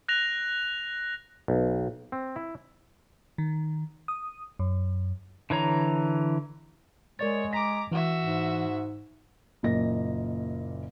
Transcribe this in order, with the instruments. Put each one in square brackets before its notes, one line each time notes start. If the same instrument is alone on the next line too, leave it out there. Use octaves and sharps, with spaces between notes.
[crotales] F#6 A#6 F7
[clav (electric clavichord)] B1
C4
E4
[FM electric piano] D#3
D#6
F#2
[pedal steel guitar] D3 E3 C#5 A#5
[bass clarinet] G#3 [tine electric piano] A#4 D5 A6 [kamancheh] C#5
[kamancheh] A#5 D6 [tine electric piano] A#6 B6
[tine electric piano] E3 [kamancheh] F#4 E5
[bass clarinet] G#2
[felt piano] F#1 A#2 A#3 D#5 A#6